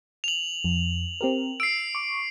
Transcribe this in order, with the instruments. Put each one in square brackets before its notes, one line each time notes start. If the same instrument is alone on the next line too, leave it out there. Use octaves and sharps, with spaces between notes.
[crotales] F7 F#7
[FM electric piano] F2
C4 G4 A#4
[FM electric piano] E6 [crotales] C7 D7
[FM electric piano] C#6 D6